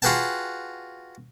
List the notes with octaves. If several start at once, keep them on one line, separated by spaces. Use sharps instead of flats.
F4 F#4 G#4 B4 G5 A5